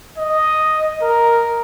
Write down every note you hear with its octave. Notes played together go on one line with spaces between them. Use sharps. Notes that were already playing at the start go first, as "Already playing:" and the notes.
D#5
A#4